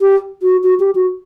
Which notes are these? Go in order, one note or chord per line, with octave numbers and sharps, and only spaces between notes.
G4
F#4
F#4
G4
F#4